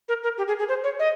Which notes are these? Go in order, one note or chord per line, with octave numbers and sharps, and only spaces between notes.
A#4
A#4
G4
G#4
G#4
C5
C#5
D#5